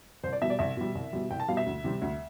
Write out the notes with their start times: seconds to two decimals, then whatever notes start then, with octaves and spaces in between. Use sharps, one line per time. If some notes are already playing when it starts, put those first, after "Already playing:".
0.23 C2 C5
0.33 D5
0.42 B2 G3 E5
0.50 D5
0.59 C2 E5
0.77 B2 G3
0.95 C2
1.13 B2 G3
1.30 C2 G5
1.40 A5
1.48 B2 G3 F5
1.57 E5
1.66 D2
1.84 C3 G3 C4
2.02 D2